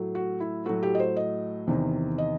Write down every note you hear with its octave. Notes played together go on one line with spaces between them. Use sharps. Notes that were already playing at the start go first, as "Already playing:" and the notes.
Already playing: A2 F#3 A3
F#4
E4
A2 F#3 A3 F#4
G4
D#5
C5
D#5
E2 C3 D#3
D#5